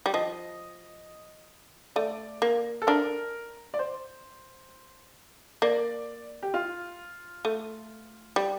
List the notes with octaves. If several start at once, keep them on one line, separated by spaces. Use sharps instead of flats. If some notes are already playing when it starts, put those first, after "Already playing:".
G3
F3 D#5
A3 D5
A#3
A4
D4 A#4
D5
C5
A#3 D5
G4
F4
A3
G3